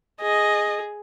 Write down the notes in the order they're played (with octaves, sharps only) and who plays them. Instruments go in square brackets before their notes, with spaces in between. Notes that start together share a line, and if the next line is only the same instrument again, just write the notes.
[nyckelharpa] G#4 [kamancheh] D#5